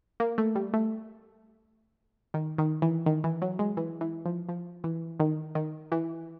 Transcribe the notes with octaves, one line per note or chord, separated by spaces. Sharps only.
A#3
A3
G3
A3
D#3
D#3
E3
D#3
E3
F#3
G#3
E3
E3
F3
F3
E3
D#3
D#3
E3